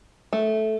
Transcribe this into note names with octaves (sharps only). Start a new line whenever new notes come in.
A3